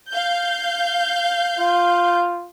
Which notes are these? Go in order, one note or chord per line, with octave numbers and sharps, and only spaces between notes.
F5 G6
F4